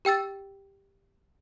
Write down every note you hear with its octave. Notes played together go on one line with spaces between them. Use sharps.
G4 G5 E6 A6